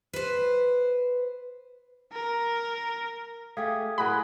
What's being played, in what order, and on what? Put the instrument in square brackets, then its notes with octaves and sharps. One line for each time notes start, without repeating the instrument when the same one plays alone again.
[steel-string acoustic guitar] B4 C5
[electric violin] A#4
[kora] A3 G4 G#4 [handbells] F5 D#6 G#6
[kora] A2 F#3 A#4 [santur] G#4 F#5 G5 [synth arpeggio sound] B5 [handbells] C6